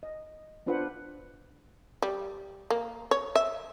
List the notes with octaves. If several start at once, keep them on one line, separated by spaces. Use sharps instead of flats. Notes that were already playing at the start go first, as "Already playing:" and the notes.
D#5
B3 D4 F4 B4 C5 F#5
G3
A#3
C#5
E5